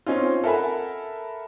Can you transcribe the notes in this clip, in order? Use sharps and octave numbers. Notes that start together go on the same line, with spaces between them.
C4 C#4 D#4 F4
A4 A#4 E5 F#5 G#5 B5